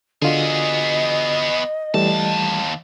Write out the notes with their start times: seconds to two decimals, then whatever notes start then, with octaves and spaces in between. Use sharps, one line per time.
0.22 D3 B3 F4 F#4 G#4 D#5
1.94 D#2 E3 G3 A3 A5